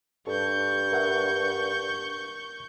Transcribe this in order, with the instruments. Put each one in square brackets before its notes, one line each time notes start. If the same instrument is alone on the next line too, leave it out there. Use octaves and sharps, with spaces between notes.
[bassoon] G2 [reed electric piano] A4 [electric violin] C#6 G6
[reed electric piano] A#4 E5 F#5